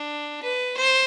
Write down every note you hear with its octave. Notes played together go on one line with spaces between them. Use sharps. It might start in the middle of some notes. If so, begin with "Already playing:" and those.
Already playing: D4
B4
C5